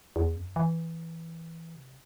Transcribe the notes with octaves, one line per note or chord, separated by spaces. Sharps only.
E2
F#2
E3
C3